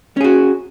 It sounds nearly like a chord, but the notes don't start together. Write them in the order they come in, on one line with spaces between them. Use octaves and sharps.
C#4 G#4 F#4